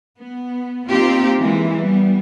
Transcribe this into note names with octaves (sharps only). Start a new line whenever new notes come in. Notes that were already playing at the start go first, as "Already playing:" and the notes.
B3
A#3 C4 D#4 F4 G4
E3 G#3 A#3
G3 B3